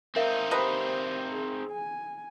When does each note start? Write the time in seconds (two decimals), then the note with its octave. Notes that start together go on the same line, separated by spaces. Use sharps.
0.16 C4 D#4 A#4 E5 F5
0.51 G4 B4 C5 D#5 A#5
1.32 G#4
1.71 G#5